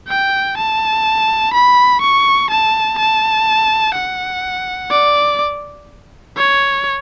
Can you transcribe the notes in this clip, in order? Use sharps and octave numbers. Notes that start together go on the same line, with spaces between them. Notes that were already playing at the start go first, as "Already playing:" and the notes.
G5
A5
B5
C#6
A5
A5
F#5
D5
C#5